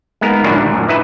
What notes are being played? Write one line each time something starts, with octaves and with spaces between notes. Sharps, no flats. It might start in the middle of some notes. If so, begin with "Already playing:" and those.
G#3 A#3 B3 D#4 A#4
A#2 D#3 F#3 G3 D4 E4
D2
F#2 A#2
D#4 E4 B4 D#5 E5